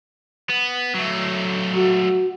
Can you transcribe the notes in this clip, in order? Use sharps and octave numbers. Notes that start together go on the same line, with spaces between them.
B3
F#3 A3
F#4